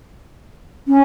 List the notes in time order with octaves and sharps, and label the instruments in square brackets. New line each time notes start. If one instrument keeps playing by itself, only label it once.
[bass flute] C#4